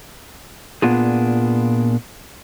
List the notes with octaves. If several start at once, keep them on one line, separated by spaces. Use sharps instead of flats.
A#2 D#3 B3 D4 F4 G#4